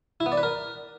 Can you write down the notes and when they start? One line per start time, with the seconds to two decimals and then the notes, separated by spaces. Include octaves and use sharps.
0.20 E4
0.26 B3
0.32 D5
0.37 B4
0.43 A#4